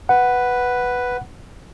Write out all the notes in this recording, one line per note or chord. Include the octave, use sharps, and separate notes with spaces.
B4 F#5